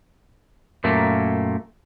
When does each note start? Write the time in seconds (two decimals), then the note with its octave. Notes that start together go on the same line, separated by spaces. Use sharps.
0.84 F#2 A#2 A3 A#3